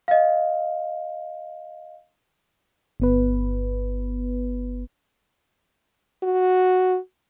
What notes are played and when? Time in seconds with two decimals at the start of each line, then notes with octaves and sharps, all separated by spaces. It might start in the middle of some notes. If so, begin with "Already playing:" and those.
0.08 D#5 F5
3.00 G1 B3 B4
6.23 F#4